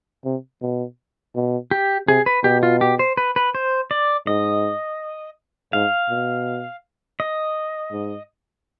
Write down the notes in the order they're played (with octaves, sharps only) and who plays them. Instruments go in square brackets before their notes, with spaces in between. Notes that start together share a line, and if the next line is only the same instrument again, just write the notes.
[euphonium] C3
B2
B2
[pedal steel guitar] G4
[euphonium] C3 [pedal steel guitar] G#4
[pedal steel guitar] B4
[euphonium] B2 [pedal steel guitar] G4
[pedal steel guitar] F4
G4
C5
B4
B4
C5
D5
[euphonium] G#2 [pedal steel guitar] D#5
[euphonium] G#2 [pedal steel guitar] F5
[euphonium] B2
[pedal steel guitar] D#5
[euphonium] G#2